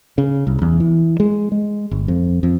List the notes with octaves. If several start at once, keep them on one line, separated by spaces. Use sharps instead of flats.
C#3
C2
E2
E3
G#3
G#3
G1
F2
F2